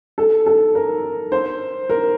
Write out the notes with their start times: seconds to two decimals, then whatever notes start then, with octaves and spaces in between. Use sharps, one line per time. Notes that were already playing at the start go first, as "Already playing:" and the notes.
0.18 A4
0.46 A4
0.75 A#4
1.32 C5
1.90 A#4